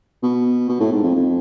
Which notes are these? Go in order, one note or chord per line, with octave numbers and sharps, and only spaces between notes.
B2
B2
A2
G#2
F2
F2